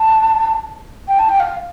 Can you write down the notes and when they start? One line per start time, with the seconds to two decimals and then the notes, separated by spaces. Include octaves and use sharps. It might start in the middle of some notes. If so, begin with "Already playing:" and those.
Already playing: A5
1.08 G5
1.19 A5
1.29 G5
1.40 F5